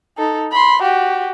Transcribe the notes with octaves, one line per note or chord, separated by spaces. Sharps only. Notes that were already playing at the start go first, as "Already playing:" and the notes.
D#4 A4
B5 C6
F#4 G4